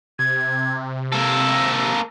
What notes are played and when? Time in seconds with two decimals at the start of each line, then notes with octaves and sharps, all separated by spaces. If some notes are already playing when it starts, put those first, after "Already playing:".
0.19 C3 G#6
1.13 A#3 A4 E6